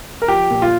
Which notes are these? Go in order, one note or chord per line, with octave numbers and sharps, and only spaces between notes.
A#4
F3 G4
A#2
F4